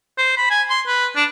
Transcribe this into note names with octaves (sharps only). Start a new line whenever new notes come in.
C5
B5
G#5
C6
B4
D4